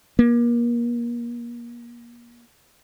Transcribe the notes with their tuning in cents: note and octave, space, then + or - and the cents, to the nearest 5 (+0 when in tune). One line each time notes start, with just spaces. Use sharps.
A#3 +35